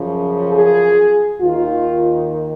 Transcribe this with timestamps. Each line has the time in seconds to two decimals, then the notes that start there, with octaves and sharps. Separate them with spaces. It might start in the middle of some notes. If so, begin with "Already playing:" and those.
Already playing: F#2 C#3 F3
0.52 G#4
1.40 D#2 D#3 F4